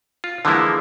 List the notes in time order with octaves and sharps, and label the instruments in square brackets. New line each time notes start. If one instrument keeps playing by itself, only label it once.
[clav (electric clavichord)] F4
D3 E3 F3 G#3 A#3 E4